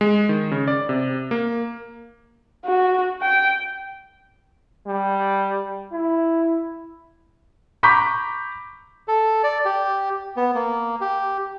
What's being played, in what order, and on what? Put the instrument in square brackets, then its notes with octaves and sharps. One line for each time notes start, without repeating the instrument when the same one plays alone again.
[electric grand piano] G#3
D#3
C#3
D5
C3
A#3
[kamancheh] F#4
G5
[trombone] G3
E4
[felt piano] A#5 B5 C#6 D6 G6 B6
[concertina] A4
D5
G4
B3
A#3
G4